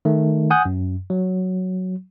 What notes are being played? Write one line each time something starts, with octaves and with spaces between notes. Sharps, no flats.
D#3 A3
F#5 G#5 D#6 F#6 G6
F#2
F#3